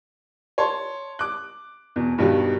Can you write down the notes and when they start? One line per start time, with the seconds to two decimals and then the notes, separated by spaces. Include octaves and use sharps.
0.58 C#5 A5 C6
1.19 D6 F#6
1.96 E2 B2
2.18 G2 B2 D#3 F#3 G3